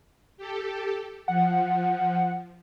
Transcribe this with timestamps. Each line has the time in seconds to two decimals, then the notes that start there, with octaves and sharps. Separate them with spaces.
0.37 G4 A4
1.28 F3 F#5